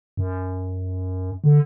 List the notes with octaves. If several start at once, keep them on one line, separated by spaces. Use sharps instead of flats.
F#2
D3